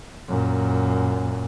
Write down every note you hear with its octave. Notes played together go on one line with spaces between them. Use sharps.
F#2 A#2